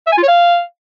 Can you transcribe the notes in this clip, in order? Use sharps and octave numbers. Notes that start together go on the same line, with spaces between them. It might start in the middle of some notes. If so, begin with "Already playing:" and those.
E5
G#5
F4
C#5
F5